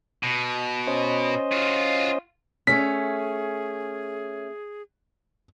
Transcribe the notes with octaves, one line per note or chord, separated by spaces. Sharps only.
B2
C#4 C5 D#5
F4 F#4
A3 C#4 G#4 B6